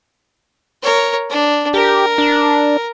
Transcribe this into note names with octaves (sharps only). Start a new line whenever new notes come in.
A#4 C#5
D4
G4 A#4
D4